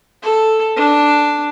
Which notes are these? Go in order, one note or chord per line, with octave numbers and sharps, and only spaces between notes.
A4
D4